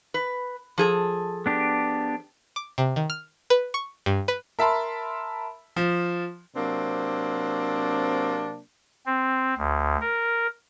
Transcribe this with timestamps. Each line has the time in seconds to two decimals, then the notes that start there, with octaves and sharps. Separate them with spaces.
0.14 B4
0.78 F3 G#4 A4
1.46 B3 D4 G4
2.56 D6
2.78 C3
2.96 D#3
3.10 F6
3.50 B4
3.74 C#6
4.06 G2
4.28 B4
4.59 A#4 E5 A5 B5 C6
5.76 F3
6.55 C3 F#3 A#3 C4 D4
9.06 C4
9.58 D2
10.01 A#4